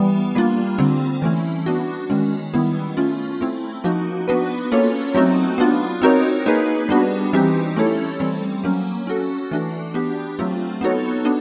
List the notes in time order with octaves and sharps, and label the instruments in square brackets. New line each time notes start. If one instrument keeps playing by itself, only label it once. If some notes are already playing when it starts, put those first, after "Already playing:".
Already playing: [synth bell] E3 G3 B3
G3 A#3 D4 F4
D3 G3 C4
E3 A3 C#4 E4
B3 D4 F#4
D#3 G#3 C#4
D#3 G3 B3 E4
A3 C#4 F4
A3 C4 E4
F3 A#3 D#4 F#4
B3 D4 F#4 B4
A#3 C#4 F4 A4 C#5
F#3 A3 C4 D#4 F#4
B3 D4 F4
C4 D#4 F#4 A#4 C#5
A#3 D#4 G#4 B4
G3 B3 D4 F#4
E3 G3 C4 D#4 G4
A3 C#4 E4 A4 C#5
E3 G3 C4
F#3 A#3 C#4
C#4 F#4 A4
E3 A3 D4 F#4
B3 D4 G4
F#3 A3 C4 F4
B3 D#4 F#4 A4 C#5
B3 D4